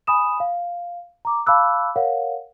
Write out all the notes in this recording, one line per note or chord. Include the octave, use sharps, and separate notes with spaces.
G#5 B5 D#6 E7
F5
A#5 D6
F5 A5 B5 D6 E6 F#6
A#4 C#5 F5 F#5